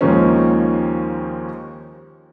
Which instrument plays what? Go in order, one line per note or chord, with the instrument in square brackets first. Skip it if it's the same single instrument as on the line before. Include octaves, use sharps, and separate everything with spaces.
[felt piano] D#2 D#3 F3 G#3 A#3 C#4